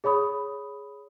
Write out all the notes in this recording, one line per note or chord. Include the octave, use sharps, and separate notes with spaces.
G#4 C#5 B5 D#6